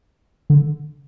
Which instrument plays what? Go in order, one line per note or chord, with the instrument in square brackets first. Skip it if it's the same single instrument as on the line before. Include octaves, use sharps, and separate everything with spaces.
[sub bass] D3